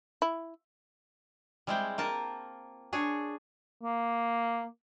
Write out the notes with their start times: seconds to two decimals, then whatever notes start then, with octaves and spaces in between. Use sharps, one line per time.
0.22 E4
1.67 G3 G#3 C4 E4 C5 G5
1.98 A#3 F4 A#4 A5 A#5
2.93 D4 G#4 C#5
3.83 A#3